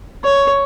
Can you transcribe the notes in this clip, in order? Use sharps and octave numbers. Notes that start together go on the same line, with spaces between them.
C#5